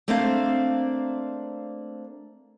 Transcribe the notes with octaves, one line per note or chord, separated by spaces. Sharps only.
A3 A#3 C4 D4 C5 F5